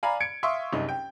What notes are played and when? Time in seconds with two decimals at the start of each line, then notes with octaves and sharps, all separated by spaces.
0.03 D5 F5 G#5 A#5 B5
0.20 G#6 C#7 D7
0.43 E5 F5 C6 C#6 D#6
0.73 F#1 C2 D#4
0.89 G5